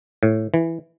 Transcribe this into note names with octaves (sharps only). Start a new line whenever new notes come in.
A2
E3